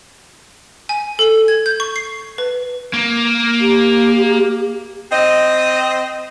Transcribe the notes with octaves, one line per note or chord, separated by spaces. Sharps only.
G#5
A4
G#6
G6
C#6
C7
B4
A#3
G4
C4 D#5